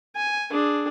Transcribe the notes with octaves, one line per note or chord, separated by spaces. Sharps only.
G#5
D4 G#4